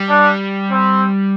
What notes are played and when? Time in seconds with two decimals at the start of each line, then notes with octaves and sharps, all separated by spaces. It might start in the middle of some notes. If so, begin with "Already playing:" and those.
Already playing: G3
0.09 D4
0.72 C4